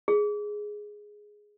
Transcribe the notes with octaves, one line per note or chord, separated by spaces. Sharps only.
G#4